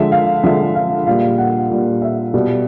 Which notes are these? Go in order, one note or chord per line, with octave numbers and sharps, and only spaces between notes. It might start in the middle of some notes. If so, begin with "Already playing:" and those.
Already playing: D3 F3 G#3 E5
F5
D3 F3 G#3 E5
F5
A#2 G3 F5
F#5
A#2 G3
E5
B2 G3